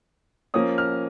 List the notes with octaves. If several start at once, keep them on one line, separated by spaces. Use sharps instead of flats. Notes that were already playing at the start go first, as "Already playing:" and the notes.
F3 A#3 C#4 D#6
F6